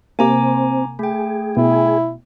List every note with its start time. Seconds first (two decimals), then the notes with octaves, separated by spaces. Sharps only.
0.19 C3 A#3 C4 G#5 A#5 D6
0.99 A3 G#4 G5
1.57 B2 E4